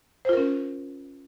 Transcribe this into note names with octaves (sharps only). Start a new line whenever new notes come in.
C#4 F4 A#4 C5